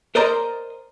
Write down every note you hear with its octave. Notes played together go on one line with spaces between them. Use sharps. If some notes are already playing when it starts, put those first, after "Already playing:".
A#4 C5 D5 D#5 A#5 C6